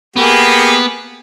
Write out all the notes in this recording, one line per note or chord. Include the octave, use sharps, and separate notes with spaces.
A#3 B3 G4 G#4